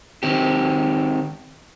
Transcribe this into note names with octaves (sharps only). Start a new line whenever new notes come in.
D#3 C4 G4